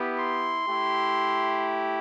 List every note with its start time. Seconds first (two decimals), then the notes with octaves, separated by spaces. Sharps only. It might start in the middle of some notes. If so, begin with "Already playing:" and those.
Already playing: B3 E4 G4
0.19 C6
0.66 A3 E4 G4